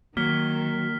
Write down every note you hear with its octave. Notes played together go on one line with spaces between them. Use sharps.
D#3 F#3 A#3 F6 B6 G7